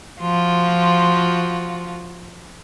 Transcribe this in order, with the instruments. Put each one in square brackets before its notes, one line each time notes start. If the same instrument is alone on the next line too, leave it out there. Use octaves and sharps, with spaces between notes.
[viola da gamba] F3 F4 F#4